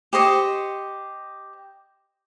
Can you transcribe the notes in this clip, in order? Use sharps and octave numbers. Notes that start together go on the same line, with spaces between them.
G4 C5 D#5 C#6